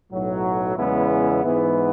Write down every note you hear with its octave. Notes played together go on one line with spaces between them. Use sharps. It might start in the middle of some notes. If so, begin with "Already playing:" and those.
B1 A2 F#3
E2 C#3 G#3 B3 E4
G#2 E3 B3